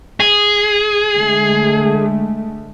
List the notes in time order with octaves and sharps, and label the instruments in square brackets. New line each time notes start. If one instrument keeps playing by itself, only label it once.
[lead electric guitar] G#4
[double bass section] D3 G#3 A3